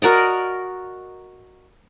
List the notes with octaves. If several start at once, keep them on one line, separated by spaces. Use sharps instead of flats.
F#4 A#4 D5 D#5